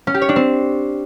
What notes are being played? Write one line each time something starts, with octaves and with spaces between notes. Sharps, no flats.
C#4
G4
C#5
D4
C4